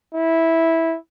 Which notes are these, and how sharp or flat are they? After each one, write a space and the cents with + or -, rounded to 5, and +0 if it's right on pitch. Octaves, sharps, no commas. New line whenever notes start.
E4 -10